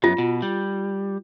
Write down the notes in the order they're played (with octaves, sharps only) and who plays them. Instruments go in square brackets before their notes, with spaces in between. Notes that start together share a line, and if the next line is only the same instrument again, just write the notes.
[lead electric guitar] F#2 B3 [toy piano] F4
[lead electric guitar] B2
G3